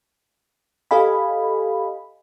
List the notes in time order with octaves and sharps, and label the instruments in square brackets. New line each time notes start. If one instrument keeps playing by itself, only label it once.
[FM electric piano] G4 A4 D#5 F5 G#5 B5